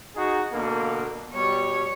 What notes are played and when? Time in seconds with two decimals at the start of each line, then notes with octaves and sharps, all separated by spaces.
0.15 D#4 F#4 G#4
0.52 B2 D3 A#3
1.34 B2 G3 C#5